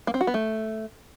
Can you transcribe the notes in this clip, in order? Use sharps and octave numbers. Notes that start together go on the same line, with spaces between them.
A#3
C4
F#4
B3
A3